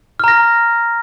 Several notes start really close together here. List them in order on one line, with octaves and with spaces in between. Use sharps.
F6 A#5 A#6